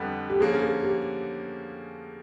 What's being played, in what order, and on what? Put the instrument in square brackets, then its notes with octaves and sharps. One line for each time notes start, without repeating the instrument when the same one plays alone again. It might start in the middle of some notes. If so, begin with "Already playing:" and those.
Already playing: [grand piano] F2 D3 G3 B3
[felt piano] G4
[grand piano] D3 F3 A#3 C#4 [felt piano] G#4
[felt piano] G#4
G4